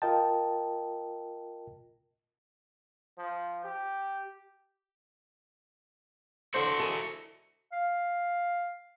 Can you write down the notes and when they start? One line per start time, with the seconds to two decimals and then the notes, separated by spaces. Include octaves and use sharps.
0.02 F4 A#4 D#5 G5 A5
3.18 F3
3.65 G4
6.54 D3 E4 F#4 C5
6.80 A4 D#5 G#5
7.72 F5